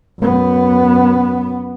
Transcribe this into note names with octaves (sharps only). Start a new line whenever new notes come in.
F#2 B3